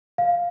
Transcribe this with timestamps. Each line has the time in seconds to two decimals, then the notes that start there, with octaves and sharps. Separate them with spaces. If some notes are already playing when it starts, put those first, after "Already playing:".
0.18 F5